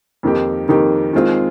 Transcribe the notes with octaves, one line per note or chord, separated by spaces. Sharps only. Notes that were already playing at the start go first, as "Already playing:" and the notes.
F2 D#3 A#3 D#4 G4
F2 D#3 A#3 D#4 G4
D#3 G#3 C4 F4 G#4